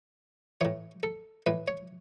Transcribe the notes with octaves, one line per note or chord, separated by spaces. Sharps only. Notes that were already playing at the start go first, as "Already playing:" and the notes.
A2 E3 C#5
A4
A2 E3 B4
C#5